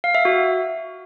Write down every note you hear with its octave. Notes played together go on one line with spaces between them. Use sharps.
F5
E5
F#4